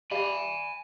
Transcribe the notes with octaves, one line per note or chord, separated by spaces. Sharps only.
G4 D5 F5 G#5 B5